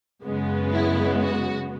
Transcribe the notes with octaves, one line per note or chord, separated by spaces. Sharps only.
F#2 C#3 G#3 B3
E4
F#4